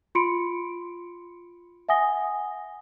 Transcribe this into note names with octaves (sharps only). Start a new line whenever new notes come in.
F4 B5 C6 C#7 D7
E5 F#5 G#5 D#6 A#6 G7